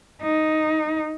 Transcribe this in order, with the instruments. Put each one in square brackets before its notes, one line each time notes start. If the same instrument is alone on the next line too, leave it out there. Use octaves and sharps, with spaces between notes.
[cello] D#4